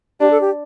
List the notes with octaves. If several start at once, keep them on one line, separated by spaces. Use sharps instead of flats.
D4 G4
A4
G4